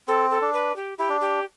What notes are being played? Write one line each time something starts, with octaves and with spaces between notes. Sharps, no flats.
C4 A4
A4
D4
B4
G4
E4 G4
D4
G4